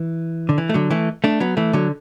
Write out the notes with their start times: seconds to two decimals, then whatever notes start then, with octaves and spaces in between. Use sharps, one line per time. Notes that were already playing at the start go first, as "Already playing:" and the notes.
Already playing: E3
0.49 D3
0.58 E3
0.69 A3
0.74 D3 F#3
0.91 E3 A3
1.24 A3 D4
1.40 F#3 B3
1.57 E3 A3
1.73 D3 F#3